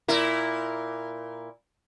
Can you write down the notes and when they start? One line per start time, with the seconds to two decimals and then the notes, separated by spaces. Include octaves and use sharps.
0.08 A#2 E4 A#4